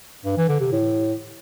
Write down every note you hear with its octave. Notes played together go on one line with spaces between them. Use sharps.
G2
E3
D3
C3
A2